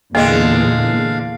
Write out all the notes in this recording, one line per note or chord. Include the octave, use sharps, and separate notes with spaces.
E2 A#2 D3 G#3 A#3 F5